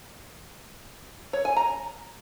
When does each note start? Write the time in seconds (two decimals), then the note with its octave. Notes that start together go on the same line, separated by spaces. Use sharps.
1.33 C#5
1.45 G#5
1.56 A#5